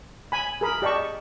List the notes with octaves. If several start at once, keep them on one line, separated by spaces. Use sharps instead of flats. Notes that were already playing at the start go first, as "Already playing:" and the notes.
G#5 B5
G#4 A#4 B5
G4 D5 D#5 A5 C#6